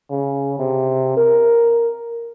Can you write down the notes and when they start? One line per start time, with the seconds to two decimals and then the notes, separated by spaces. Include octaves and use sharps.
0.10 C#3
0.59 C3
1.17 A#4